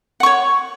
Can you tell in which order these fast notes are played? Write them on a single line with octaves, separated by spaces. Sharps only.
F#5 C#6 C#5